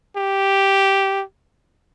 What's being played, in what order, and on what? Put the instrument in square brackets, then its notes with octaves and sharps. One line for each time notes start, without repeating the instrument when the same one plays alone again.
[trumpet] G4